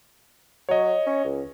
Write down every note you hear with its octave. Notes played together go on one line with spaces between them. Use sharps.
F#3 C#5 D#5
C#4
C#2